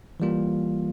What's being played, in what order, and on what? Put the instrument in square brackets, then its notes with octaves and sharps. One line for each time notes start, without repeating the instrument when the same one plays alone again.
[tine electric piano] E3 G3 A#3 F4